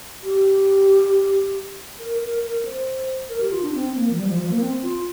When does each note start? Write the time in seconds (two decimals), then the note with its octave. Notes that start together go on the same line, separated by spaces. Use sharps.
0.24 G4
1.99 A#4
2.21 A#4
2.43 A#4
2.65 C5
3.29 A#4
3.41 G4
3.51 F4
3.63 D4
3.74 C4
3.96 A#3
4.10 F3
4.17 G3
4.28 F3
4.39 F3
4.51 A#3
4.61 C4
4.83 F4